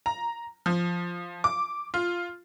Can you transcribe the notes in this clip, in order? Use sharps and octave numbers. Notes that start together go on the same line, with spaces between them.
A#5
F3
D6
F4